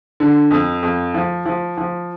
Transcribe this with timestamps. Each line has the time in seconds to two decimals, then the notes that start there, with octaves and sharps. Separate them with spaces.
0.20 D3
0.51 F2
0.83 F2
1.14 F3
1.46 F3
1.78 F3